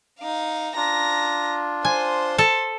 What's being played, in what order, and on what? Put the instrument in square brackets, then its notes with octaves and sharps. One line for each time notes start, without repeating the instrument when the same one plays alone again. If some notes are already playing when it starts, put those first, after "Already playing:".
[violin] D#4 F5
[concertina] D4 F4 [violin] A#5 A#6
[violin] C5 C6 [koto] G#5
[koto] A4 A5